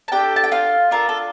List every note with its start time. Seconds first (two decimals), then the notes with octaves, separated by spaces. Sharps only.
0.08 A5
0.12 D4 G4 A4 G5
0.36 A5
0.44 G5
0.52 F4 F5
0.91 D4 F4 A4 A#4
1.09 A4